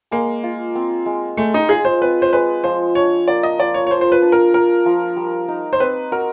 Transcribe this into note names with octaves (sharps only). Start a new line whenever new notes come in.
G#3 A#3
F4
C4
G#3
G#3 A3
D#4
F4 G#4
C5
C4 B4
C5
G#3 B4
F3 C5
D4 C#5
A#3 D5
D#5
F3 D5
C#5
C#5
F3 C5
C5
B4
D4
A#4
A#3 A#4
F3
G3
D#4
C5
C4 B4
F#4 A#4